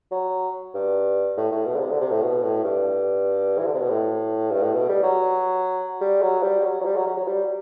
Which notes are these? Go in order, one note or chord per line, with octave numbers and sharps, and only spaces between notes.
F#3
G2
A2
A2
B2
D3
C3
D3
C3
A2
B2
A2
G2
E3
D3
C3
B2
A2
G2
A2
B2
G3
F#3
G3
F#3
G3
F#3
F#3
G3
F#3
F#3
F#3
G3